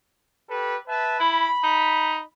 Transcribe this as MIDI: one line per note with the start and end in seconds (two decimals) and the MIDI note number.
0.50 0.76 67
0.50 0.76 69
0.50 0.76 71
0.88 1.18 71
0.88 1.18 76
0.88 1.18 81
1.20 1.48 64
1.20 2.27 83
1.64 2.20 63